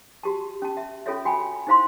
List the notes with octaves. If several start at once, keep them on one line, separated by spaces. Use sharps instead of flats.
F#4 G4 A5
C#4 A5
E5
C#4 F4 A4 C#5 E5
F#4 G5 G#5 B5
D#4 E4 C5 F5 A#5 C6